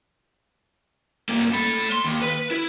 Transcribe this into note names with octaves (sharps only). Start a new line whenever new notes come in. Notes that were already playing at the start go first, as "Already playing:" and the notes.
G2 A#3
A3 B5
C6
D#2
B4
E4